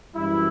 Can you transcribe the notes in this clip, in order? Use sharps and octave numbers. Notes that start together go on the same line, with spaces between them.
F#2 E3 G3 E4